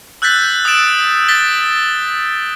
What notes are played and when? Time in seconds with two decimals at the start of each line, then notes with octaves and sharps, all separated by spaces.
0.22 E6 F#6 G6 A6 B6
0.65 D#6 E6 A6 D7 E7
1.28 A6 B6 G7